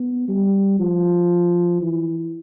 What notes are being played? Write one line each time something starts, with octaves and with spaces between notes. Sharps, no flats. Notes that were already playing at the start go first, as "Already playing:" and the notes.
Already playing: B3
G3
F3
E3